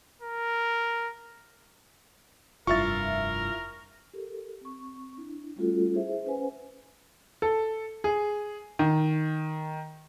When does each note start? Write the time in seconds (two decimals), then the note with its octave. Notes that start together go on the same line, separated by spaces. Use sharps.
0.22 A#4
2.67 F1 G2 E4 F4 A#4 C#6 A6
4.14 G4 A4 A#4
4.61 C4 C#6
5.17 D4 E4
5.56 G3 A3 C#4 F4 F#4 A4
5.93 E4 G#4 C5 E5
6.26 C#4 B4 C5 F#5 G#5
7.42 A4
8.04 G#4
8.79 D#3